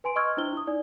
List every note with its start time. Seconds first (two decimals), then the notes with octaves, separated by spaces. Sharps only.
0.04 B4 G#5 C6 D7
0.16 D#5 C6 C#6 E6 F6 G#6
0.37 D4 E4 C5 G7
0.53 E4 D#6
0.67 D#4 D5